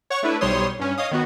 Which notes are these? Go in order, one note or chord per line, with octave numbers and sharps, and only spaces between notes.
C#5 F#5 C#6
A3 D4 E4 B4
B1 G3 C5 C#5 C6 D#6
G2 C#4
C#5 D#5 F5 D#6
D#3 B3 F#4